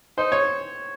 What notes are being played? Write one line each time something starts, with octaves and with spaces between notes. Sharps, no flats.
D#4 C5
C#5